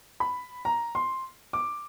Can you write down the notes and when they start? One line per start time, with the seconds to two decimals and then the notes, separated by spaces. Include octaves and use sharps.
0.20 B5
0.65 A#5
0.95 C6
1.53 D6